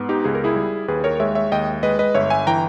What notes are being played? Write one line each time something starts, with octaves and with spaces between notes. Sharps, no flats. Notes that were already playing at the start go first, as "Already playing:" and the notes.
Already playing: G#2 B3
D#4 G4
C#2 G#4
A#4
E4 G#4
G3
D#2 G#4 B4
A#4 C#5
G#3 C#5 E5
C#5 E5
D#2 D#5 G5
G#3 B4 D#5
B4 D#5
G1 C#5 E5
E5 G#5
E3 G5 A#5